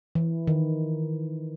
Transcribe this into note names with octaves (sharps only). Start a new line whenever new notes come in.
E3
D#3